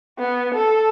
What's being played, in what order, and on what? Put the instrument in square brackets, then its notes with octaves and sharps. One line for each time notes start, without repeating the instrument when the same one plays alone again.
[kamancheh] B3
A4